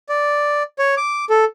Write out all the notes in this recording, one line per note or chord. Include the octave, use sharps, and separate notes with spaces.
D5
C#5
D6
A4